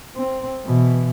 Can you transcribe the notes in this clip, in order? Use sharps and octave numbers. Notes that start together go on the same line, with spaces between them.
C4
B2 E3